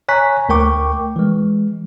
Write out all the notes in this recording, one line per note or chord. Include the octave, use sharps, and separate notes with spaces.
C#5 G#5 A#5 C#6 F#6 B6
D2 A3 A#4 G5 C#6 D6
E3 G#3